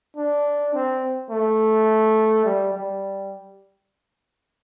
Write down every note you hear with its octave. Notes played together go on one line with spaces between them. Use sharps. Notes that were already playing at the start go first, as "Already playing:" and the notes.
D4
C4
A3
G3
G3